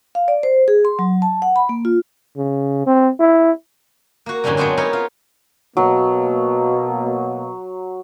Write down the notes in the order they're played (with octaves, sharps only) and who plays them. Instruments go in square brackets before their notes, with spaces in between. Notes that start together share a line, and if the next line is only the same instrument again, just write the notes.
[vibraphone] F5
D5
C5
G#4
C6
F#3
A5
F#5
B5
A#3
F4
[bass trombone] C#3
C4
E4
[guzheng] A#3 F#4
F#2 A2 D3 E3 F3 G3
F#3 G#3 B3 C4 D4
B3 D#4 E4 A#4 C#5
F4
[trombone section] B2 A#3 [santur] F#3